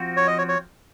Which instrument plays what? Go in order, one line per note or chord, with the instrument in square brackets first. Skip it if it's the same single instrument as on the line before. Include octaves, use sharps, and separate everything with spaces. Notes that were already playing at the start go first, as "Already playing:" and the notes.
Already playing: [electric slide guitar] F3 C4 F#4
[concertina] C#5
D#5
C#5
C#5